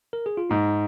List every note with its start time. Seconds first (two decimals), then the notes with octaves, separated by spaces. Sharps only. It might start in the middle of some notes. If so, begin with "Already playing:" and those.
0.13 A#4
0.26 G#4
0.37 F4
0.50 G#2 D#4